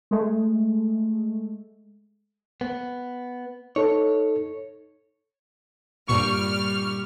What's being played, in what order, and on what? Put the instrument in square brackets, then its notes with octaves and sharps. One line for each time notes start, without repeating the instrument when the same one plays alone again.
[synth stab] G#3 A3
[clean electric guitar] B3
[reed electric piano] D#4 A4 [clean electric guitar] C#5
[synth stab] G2 A#2 C#6 [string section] G3 F6